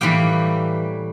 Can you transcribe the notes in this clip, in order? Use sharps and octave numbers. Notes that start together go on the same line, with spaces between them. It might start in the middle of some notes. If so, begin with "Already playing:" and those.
A2 E3 G3 A#3 G5